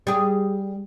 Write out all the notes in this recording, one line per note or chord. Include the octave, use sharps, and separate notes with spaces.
G3 G#4